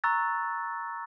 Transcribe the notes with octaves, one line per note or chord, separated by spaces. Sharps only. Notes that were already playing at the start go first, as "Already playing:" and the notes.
A#5 C#6 E6 F#6 A6